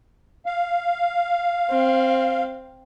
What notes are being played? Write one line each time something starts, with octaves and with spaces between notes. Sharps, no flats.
F5
C4